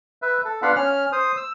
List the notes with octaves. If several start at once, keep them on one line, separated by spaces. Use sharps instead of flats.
B4 E5
A4
B3 D4 F4 F5 F#5 B5
C#4 F6
C5 D#6
E6